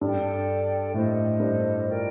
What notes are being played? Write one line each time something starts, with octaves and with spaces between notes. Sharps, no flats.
G2 A4 D5 G5
A2 A4 C5 D#5
G2
F4 A#4 D5 G5